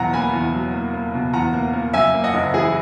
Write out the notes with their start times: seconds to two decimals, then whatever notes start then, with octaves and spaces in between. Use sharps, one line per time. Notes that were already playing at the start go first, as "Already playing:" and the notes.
Already playing: E2 B2 F#3 F#5 A#5
0.13 A#3 G#5 B5
0.33 E2
0.54 F#3
0.74 A#3
0.93 A#3
1.14 B2
1.33 E2 F#5 A#5
1.53 A#3
1.73 A#3
1.94 F#2 E5 G#5
2.14 A#3
2.24 D#5 F#5
2.34 F#1
2.53 E3 G#4